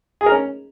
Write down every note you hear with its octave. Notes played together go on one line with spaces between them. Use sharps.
G#4
A#4
C#4